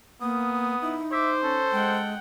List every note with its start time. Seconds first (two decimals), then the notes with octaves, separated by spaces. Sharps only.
0.22 A#3 B3 D#6
0.82 D#4 E4
1.12 C5 E5 D6
1.44 C#4 A4
1.72 G#3 F#5 G5